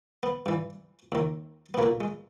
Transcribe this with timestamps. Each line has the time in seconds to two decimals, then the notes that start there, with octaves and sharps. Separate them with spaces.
0.23 B3
0.46 G2 E3
1.12 D#2 D#3
1.74 B3
1.78 B1 A#3
1.83 A#2
2.01 G#3